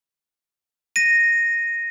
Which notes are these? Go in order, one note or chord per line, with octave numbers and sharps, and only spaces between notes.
A#6 D#7